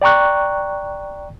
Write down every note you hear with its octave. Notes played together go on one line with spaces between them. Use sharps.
D5 G5 A#5 C#6 F#6